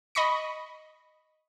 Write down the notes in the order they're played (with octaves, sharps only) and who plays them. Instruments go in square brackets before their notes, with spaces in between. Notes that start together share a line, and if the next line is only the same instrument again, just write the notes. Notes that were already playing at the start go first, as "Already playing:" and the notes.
[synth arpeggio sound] D#5 B5 C#6 A#6 C#7